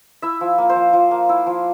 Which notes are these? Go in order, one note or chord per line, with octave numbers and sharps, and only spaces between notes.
E4 E5
F3
A#3
C5
F3
F3
A#3
E4
F3